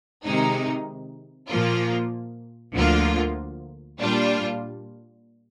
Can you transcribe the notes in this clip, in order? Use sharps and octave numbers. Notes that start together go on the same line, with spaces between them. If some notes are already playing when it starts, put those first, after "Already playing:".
C3 D#3 G#3 D#4
A#2 F3 A#3 F4
D2 D3 F3 A#3 F4
A#2 G3 D4 F4